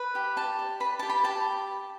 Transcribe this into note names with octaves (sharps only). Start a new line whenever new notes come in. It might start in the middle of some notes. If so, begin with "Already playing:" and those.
Already playing: B4
G4
G4 A5
D5
B4 B5
G4 A5
B5
G4 A5